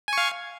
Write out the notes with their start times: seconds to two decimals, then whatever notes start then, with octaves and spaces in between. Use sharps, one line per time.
0.08 G#5
0.13 C#6
0.18 F5